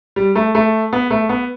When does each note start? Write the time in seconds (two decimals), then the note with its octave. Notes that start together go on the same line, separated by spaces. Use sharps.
0.16 G3
0.35 A3
0.55 A3
0.93 B3
1.10 A3
1.29 B3